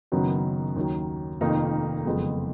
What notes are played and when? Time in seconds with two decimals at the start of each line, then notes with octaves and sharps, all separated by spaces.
0.12 F#1 F#2 D#3 F#3 B3
0.76 D#2 D#3 F#3
1.41 F1 F2 D#3 A#3 D#4
2.05 F#1 F2 F3 G#3 B3